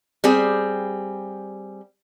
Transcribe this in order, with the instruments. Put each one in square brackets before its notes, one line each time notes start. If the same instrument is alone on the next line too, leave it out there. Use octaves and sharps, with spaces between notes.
[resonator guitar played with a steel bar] G3 C4 G#4